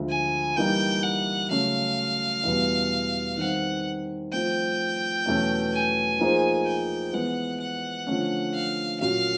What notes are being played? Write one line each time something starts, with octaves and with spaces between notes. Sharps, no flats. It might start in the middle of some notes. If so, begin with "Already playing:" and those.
Already playing: D2 D3 F3 G#3
G#5
E3 G3 A#3 D#4 G5
F#5
C#3 F#3 A3 C#4 F5
E2 B2 G3 B3
D#3 G3 C4 F#5
F3 A3 C4 G5
E2 B2 F#3 A3 C#4
G#5
F3 A#3 D#4 G#4 C5
G5
E3 G#3 B3 F#5
F#5
D3 F3 A3 C#4
F5
A#2 F#3 A#3 C#4 F#4 F5